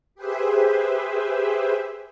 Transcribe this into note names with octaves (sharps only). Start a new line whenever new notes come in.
G4 G#4 B4 C5 E5